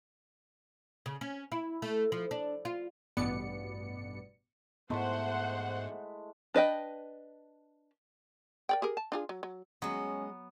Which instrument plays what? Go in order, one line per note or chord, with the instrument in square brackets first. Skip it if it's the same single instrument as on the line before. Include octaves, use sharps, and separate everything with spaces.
[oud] C#3
C#4
E4
A3
F3
D4
F4
[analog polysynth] A1 G2 B2 B3 D5 C#7
[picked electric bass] G#2 B3 [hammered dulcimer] G#3 A3 E4 [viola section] C5 F#5
[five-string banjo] D4 B4 D#5 G5
[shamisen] A#4 D5 G5
G4 G#4 A#4
A5
D4 F4 G#4
F#3
F#3
[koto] F#3 [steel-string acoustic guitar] G#3 D#5 [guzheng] B3 [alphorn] C#4